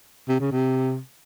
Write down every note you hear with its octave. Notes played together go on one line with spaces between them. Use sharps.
C3
C#3
C3